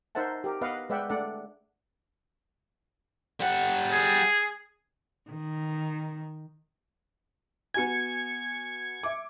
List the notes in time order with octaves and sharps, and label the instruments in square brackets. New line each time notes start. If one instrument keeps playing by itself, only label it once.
[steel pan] D#4 A#4 C5 E5 F#5 A5
G4 A#4
B3 B4 D#5 F5 F#5
G#3 B4 D5 E5 F#5 G5
A3 D4 A4 D5 F#5
[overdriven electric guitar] G3 F#5
[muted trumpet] G#4
[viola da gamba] D#3
[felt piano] B3 F#4 G#5 [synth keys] G#6 C#7
[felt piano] E5 D6